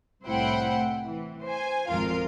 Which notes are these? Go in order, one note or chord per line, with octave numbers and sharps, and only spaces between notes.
C2 A2 E4 C5 F#5 G5
E3
C5 G#5
G#1 F2 F3 F4 A#4 F5